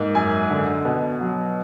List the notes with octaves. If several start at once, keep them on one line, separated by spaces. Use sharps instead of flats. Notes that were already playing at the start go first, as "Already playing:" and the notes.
Already playing: G#2 A#3
F#2 G#5
D3
B2
F#3